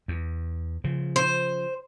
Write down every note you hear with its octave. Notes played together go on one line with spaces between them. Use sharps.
E2
C#3 F3
C5